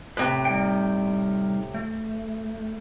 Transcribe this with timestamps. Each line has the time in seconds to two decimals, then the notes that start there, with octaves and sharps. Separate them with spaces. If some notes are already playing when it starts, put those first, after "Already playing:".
0.17 A2 C3 B4
0.45 G3 D#4 G5
1.74 A3